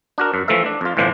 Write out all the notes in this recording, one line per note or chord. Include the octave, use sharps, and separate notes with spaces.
D4 F#4 A#4
F#2
E3 F3 A3 A4 E5
D4
F2 F4
G1 A2 E3 F3 D4 C5